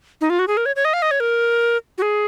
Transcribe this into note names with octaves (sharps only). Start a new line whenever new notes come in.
D#4
F4
F#4
G#4
A#4
C#5
C#5
D#5
F5
D#5
C#5
A#4
F#4
G#4